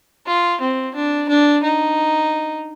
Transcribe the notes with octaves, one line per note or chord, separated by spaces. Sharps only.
F4
C4
D4
D4
D#4